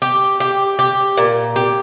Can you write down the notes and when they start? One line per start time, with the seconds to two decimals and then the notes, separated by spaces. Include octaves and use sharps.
0.02 G4
0.40 G4
0.79 G4
1.17 A#2
1.56 G4